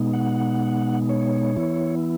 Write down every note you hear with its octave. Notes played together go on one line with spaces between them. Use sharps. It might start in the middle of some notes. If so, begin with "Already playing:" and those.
Already playing: B2 G#3 B3 D#4
F#5
C#5
E3 B3 E4